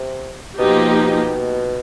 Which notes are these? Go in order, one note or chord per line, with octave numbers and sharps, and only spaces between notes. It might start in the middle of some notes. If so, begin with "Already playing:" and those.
Already playing: C3
B2 F3 A#3 D#4 G4